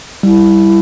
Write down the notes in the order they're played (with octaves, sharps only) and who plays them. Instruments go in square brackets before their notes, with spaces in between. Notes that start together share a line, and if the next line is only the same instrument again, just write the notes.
[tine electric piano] G3 [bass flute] E4